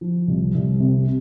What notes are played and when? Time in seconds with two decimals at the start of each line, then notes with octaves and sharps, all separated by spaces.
0.01 F3
0.28 C2
0.54 C2
0.80 C3